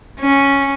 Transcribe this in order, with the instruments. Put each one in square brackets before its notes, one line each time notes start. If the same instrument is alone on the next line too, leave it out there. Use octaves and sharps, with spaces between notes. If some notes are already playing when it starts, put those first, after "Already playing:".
[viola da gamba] C#4